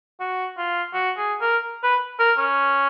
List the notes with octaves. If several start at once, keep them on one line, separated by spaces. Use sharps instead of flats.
F#4
F4
F#4
G#4
A#4
B4
A#4
C#4